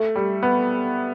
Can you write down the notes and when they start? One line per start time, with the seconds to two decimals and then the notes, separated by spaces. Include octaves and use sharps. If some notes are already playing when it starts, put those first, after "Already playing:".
Already playing: A3
0.16 G3
0.43 B3